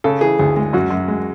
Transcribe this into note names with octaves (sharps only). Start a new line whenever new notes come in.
C#3 A4
E3 G#4
D2 G#4
G#3
F#2 F#4
F#2
G#3